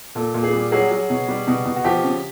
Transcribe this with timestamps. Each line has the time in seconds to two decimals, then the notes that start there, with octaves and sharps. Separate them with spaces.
0.15 A#2 A4
0.34 A#2
0.43 G#4
0.53 G3
0.72 F#3 G#4
0.91 F#3
1.10 B2
1.28 G3
1.47 B2
1.65 B2
1.76 F#4
1.84 F3 G4
2.03 C#3